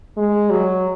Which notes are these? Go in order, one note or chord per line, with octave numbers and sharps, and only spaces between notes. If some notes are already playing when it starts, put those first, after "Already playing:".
G#3
F#3